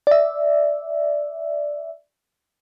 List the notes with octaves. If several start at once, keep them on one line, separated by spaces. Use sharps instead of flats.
D5 E5